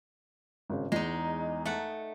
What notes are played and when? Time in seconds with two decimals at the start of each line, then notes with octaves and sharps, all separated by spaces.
0.70 G#1 C#3
0.92 E2 G#3 D#4
1.66 A3 F#5